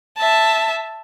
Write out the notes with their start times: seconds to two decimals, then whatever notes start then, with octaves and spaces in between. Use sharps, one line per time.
0.17 E5 A5